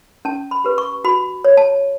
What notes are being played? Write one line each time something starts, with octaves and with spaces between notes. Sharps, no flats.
C#4 A5
B5
G4 B4
C#6
F#4 B5
C#5
A5